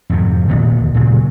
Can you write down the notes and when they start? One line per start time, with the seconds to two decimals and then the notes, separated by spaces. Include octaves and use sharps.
0.10 F2 G#2 C3
0.48 D1 C2 A#2 D#3
0.94 A#2 C#3 F#3